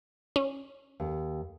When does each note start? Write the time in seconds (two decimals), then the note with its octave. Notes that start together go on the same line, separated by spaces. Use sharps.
0.36 C#4
1.00 D#2